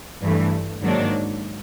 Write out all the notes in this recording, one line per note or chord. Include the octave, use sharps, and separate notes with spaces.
G2 E3 A3
G#2 D#3 F#3 A#3 D4